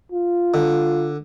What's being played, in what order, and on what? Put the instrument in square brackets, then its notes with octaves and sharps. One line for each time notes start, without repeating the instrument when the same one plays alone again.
[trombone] F4
[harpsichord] D3